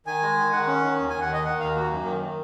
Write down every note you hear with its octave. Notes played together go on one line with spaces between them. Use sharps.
D#3 G#5
G#3
D#3
D#3 F#5
C#4
D#3
D#2
D#2 G#5
F#5
D#3 D#5
D#3 F#5
D#2 F5
A#3 F#4
F#2
D#3
D#3